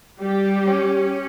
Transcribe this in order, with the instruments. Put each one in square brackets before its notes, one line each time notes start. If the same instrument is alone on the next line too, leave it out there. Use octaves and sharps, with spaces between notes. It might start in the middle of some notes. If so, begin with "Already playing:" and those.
[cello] G3 [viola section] G4
[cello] C#4